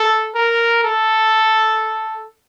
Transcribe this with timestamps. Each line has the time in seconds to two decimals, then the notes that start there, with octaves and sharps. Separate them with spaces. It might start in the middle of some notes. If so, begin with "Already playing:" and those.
Already playing: A4
0.35 A#4
0.84 A4